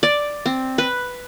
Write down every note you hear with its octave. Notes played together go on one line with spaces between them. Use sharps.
D5
C4
B4